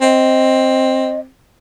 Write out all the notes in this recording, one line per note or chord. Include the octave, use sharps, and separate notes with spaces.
C4 D#5